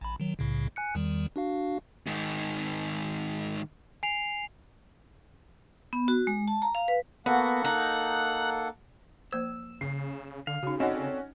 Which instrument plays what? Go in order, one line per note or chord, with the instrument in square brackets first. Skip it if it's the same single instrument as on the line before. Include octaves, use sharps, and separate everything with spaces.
[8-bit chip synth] A1 B5
D#3 F#3
C2 A2 C#3
G#5 F#6 C#7
E2 D#3 G3
D4 F#4 F5
[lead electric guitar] G#2 D#3
[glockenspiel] G#5 C7 F7
[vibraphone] B3
F#4
G#3
A5
A#5
F5
B4
[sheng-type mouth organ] A#3 A4 F#5 [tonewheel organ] B3 [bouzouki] F#4
[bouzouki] D#4 [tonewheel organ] F#6
[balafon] F3 A#3 C5 [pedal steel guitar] E6
[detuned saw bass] C#3 [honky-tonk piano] C7
[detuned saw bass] D3 [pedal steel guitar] F5
[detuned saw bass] C#3 [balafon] D#4 F#4
[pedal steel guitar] C4 A4 D5 [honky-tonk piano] C#4 F#4 [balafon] D#4 D#5